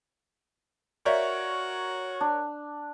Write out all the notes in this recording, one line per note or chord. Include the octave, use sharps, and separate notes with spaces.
F#4 A#4 C#5 D5 E5 F5
D4